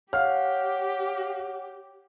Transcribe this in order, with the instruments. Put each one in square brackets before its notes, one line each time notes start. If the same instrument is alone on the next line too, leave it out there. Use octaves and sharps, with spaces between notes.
[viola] G4 [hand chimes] C#5 F#5 [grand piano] F5 F6